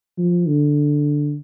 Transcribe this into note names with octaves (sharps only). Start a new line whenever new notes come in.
F3
D3